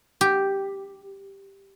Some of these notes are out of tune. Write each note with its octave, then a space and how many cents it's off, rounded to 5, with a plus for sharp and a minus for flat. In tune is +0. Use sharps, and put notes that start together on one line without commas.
G4 +0